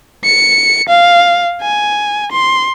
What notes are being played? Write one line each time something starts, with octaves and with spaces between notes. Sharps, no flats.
C#7
F5
G#5
C6